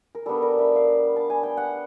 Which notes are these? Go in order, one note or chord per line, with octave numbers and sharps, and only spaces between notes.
A#4
G3 B3 D4 A4
A#4
E5
F5
A5
G#5
G5
F#5